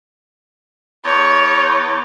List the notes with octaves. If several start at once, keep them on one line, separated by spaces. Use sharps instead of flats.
E2 C#5